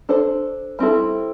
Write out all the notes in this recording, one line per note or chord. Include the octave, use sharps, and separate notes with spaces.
D4 A4 C5
G3 C4 E4 A4